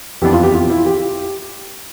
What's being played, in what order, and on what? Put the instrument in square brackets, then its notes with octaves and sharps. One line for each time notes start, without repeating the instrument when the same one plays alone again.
[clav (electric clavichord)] F2 E3 B3 D4 [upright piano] G4
[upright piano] F4
G4
F4
E4
G4